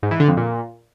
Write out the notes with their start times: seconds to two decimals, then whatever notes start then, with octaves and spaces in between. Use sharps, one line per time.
0.03 G#2
0.11 E3
0.20 D3
0.28 F2
0.37 A#2